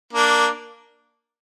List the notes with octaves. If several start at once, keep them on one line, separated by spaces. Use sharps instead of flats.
A#3 D4